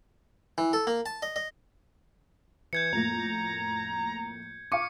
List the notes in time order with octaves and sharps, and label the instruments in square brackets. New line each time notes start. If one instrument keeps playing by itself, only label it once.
[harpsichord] E3
A4
A#3
A5
D#5
D#5
[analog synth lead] E3 [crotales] G6 G#6 C#7
[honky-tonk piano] F2 A2 A#3 [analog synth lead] A#5
[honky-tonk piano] F5 D6 [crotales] C#6 C#7